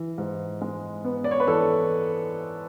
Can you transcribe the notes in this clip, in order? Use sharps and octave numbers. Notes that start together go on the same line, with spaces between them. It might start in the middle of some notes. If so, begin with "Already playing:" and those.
Already playing: E3
G#2
G#3
B3
D5
C#5
B4
E3 A4